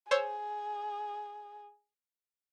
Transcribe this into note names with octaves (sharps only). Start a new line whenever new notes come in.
G#4 C5 C#5 E6